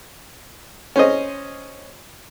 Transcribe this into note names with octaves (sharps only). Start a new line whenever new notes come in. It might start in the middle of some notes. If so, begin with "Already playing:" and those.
C#4 C5 D#5